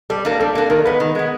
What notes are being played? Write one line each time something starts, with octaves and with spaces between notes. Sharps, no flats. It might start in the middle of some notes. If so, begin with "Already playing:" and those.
G3 A4
A#3 D4 A#4
G3 A4
A#3 D4
D#3 A#4
G#3 B3 B4
D#3
G#3 B3